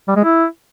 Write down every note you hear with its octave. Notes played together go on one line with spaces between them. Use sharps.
G3
G#3
E4